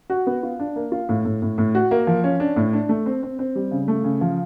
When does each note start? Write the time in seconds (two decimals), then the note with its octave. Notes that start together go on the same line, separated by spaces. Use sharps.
0.10 F#4
0.27 B3
0.43 F4
0.60 D4
0.76 A#3
0.92 F4
1.09 A2
1.25 A2
1.42 A2
1.58 A2
1.75 F#4
1.91 A#3
2.07 F3
2.24 C#4
2.40 D4
2.56 A2
2.73 D4
2.89 A3
3.06 C4
3.23 C4
3.39 C4
3.55 G3
3.71 C#3
3.88 A3
4.04 C#3
4.21 F3